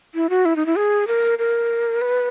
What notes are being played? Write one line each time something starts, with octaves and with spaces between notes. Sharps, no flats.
E4
F#4
E4
D#4
E4
G#4
A#4
A#4
B4